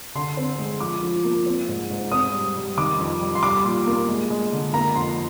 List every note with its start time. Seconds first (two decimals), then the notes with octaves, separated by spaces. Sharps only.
0.15 D3 C6
0.37 C4
0.59 G#3
0.80 F3 D6
1.03 F3
1.24 A#3
1.46 C4
1.68 G#2
1.90 G#2
2.12 C4 D#6
2.34 G3
2.56 G3
2.77 D#3 D6
2.99 F2
3.21 G3
3.35 C6
3.43 G3 D6
3.64 A#2
3.87 A#3
4.08 G#3
4.30 G#3
4.52 D3
4.74 A#3 A#5
4.95 F2 C6